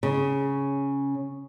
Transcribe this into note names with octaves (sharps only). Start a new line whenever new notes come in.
C#3